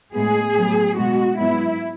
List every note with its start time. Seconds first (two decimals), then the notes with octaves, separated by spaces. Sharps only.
0.14 A2 G#3 B3 G#4
0.55 A2 F#3 B3
0.97 B2 G#3 B3 F#4
1.39 G#2 F#3 B3 E4